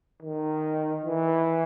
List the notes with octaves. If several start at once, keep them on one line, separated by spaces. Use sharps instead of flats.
D#3
E3